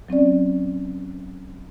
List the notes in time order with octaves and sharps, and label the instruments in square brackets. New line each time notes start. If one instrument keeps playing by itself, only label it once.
[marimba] F#3 C4 C#4 D5